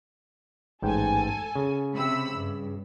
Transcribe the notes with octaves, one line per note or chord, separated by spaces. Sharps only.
A1 G#2 A4 G5 G#5
C#3
C3 B5 E6
G2